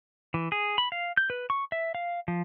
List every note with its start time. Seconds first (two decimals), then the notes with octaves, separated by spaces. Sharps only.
0.34 E3
0.52 G#4
0.78 B5
0.92 F5
1.17 G6
1.30 B4
1.50 C#6
1.72 E5
1.95 F5
2.28 F3